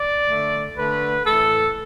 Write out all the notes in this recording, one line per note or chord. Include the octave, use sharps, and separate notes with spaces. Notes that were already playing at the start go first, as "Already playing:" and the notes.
Already playing: D5
D3 A3
D3 A3 B4
A2 E3 A3 A4